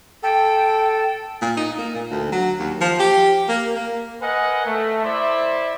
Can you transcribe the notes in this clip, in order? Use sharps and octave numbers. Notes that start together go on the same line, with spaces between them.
A4 G5
A#2
D#4
A#3
A#2
D2
F#3
D#2
F3
G4
A#3
A#3
A#4 B4 D#5 F#5 G#5
A3
E4 C5 D5 E5 C6